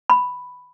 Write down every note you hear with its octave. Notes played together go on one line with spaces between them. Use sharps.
B5